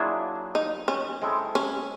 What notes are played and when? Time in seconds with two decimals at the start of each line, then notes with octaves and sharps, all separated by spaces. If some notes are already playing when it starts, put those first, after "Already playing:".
Already playing: F#3 A#3 D4 E4 F4 G#4
0.55 D#4
0.88 C#4
1.22 G#3 C4 E4 A4
1.55 C#4